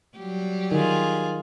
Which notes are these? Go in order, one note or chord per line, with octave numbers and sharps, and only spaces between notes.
F#3 G3 G4
D#3 F4 G#4